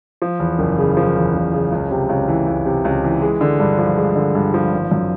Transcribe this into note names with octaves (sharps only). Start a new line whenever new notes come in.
F3
E2
F#1
C#3
F3
E2
F#1
C#3
C#2
C3
C#2
E3
C#2
C3
C#2
E3
G#3
D3
G2
F3
G#3
D3
G2
F3
G#1
F#2